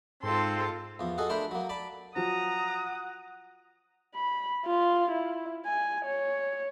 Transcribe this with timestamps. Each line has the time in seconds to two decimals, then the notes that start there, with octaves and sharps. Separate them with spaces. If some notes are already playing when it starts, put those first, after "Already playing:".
0.23 G#2 C4 F4 A4 C6
0.99 E2 F3
1.18 F#4 G#4 A4 D#5
1.29 A3 D4 A#4 C5 A#5 B5
1.51 F#3 A#3
1.69 D5 A5 B5
2.16 F3 F#3 F#5 A#5 D#6
4.15 B5
4.66 F4
5.11 E4
5.66 G#5
6.06 C#5